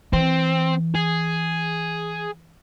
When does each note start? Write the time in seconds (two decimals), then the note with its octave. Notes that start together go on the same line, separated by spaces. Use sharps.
0.13 E3 C4
0.95 G#4